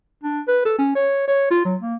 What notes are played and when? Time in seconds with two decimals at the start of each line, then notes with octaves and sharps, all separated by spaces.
0.23 D4
0.48 B4
0.65 A4
0.78 C#4
0.95 C#5
1.28 C#5
1.50 F4
1.65 F#3
1.81 A#3